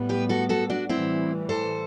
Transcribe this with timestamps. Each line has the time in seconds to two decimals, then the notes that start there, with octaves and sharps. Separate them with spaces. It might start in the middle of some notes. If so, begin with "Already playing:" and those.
Already playing: A2 G3 B3
0.09 G4 B4
0.29 F#4 A4
0.49 F#4 A4
0.70 D4 F#4
0.89 A2 E3 G3 C4 E4
1.49 A4 C5